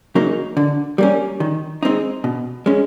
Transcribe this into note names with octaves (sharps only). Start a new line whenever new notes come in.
C#3 F#3 A#3 D#4
D3
G3 A#3 C#4
D#3
G#3 C4 D#4
B2
G#3 C#4